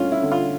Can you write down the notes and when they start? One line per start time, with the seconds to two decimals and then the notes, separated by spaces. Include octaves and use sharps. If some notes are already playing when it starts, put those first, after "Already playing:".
Already playing: G2 A3 C#4 F4
0.12 E4
0.22 D3
0.32 F4